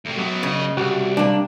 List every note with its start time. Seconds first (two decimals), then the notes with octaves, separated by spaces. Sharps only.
0.05 D2 C3
0.17 F#2 F#3 B3
0.43 A#2 C#3 D#5
0.77 C2 F#4 G4 F#5
1.17 C3 G3 A#3 D4